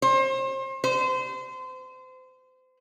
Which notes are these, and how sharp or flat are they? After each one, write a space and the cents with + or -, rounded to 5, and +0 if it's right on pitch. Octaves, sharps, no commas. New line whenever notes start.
C5 +35
C5 -30